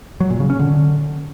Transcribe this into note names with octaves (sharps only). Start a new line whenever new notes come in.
F#3
A#2
C#3
C#4
D3